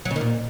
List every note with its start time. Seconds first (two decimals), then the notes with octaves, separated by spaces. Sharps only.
0.05 F#3
0.11 C#3
0.16 D#3
0.21 A#2